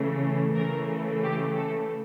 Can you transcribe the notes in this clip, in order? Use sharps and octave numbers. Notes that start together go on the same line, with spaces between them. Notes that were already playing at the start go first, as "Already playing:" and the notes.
Already playing: C#3 E3 A3
C#3 E3 A3 A#4
G4
A4